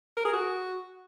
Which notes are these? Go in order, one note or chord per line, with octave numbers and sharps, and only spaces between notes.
A#4
G#4
F#4